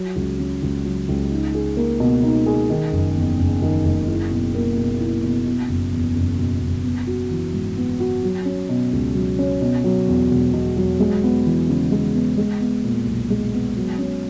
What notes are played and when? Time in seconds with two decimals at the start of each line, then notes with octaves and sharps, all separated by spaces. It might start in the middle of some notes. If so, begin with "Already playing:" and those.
Already playing: F#3
0.16 C#2
0.39 C#3
0.62 C#2
0.85 F#3
1.08 C#2
1.31 D#4
1.55 G#4
1.77 A#3
2.00 B2
2.23 D#4
2.46 G#4
2.70 D#3
2.93 F#1
3.15 E2
3.39 F#1
3.62 D#3
3.85 F#1
4.08 E4
4.30 B2
4.54 A#3
4.76 B2
5.01 E4
5.24 B2
5.46 B2
5.69 F#1
5.92 E2
6.16 F#1
6.39 B2
6.62 F#1
6.84 B3
7.07 F#4
7.31 E3
7.54 G#2
7.77 B3
8.00 F#4
8.23 F#3
8.45 C#4
8.69 B2
8.93 C#2
9.15 F#3
9.39 C#4
9.61 B2
9.84 F#3
10.07 E2
10.30 E1
10.53 B2
10.77 F#3
11.00 G#3
11.23 B3
11.45 E3
11.69 C#3
11.92 G#3
12.14 B3
12.38 G#3
12.60 B3
12.84 A#2
13.06 B1
13.30 G#3
13.53 B3
13.76 F#3
13.99 C#4